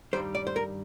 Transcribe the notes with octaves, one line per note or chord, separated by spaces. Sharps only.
G2 D#3 G3 C5
D5
C5
A#4